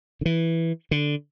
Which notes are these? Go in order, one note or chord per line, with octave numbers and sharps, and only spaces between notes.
D3
E3
D3